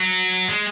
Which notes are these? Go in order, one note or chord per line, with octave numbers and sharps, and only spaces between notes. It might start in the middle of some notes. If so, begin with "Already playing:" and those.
Already playing: F#3
G#3